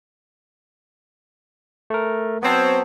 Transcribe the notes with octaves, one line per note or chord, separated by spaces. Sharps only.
A3 A#4
F#3 B3 C4 C#5 A5